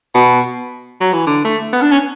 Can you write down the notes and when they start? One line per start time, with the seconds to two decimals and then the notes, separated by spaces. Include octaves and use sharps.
0.14 B2
1.01 F#3
1.13 E3
1.26 D3
1.44 A3
1.73 B3
1.82 D4
1.91 C#4